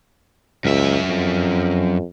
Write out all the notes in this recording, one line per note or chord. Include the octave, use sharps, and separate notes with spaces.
C#2 F#2 E5
F2